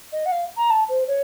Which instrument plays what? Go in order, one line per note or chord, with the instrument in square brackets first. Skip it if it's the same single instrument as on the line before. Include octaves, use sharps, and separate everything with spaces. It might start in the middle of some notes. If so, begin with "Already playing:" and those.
[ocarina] D#5
F#5
F5
A#5
A5
C5
C#5